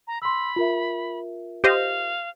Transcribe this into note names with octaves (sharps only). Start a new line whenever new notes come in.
A#5
B5 C6 E6
F4 A#4 E5
G4 C5 D#5 F5